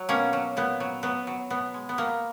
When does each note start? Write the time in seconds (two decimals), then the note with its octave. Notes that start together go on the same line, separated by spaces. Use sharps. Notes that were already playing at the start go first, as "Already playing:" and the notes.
Already playing: F#3
0.09 B2 A#3 C#4
0.33 F#3
0.57 A#2 B3
0.80 F#3
1.03 F#3 B3
1.27 F#3
1.50 B2 B3
1.74 G#3
1.89 B3
1.98 B2 A#3